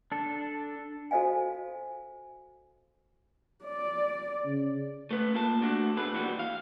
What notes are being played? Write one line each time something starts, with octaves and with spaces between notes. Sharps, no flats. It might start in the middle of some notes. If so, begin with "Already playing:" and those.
D4 A4
F#4 A4 C5 D#5 F5 G#5
D5
C#3
A3 B4
A#3 F4 A5
A3 D4 F#4
B2 A3 G#4 B4
D#2 E3 G3 F#4
F5